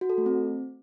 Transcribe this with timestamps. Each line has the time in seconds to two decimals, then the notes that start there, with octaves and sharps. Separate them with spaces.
0.01 F#4
0.10 A4
0.18 A3
0.26 C4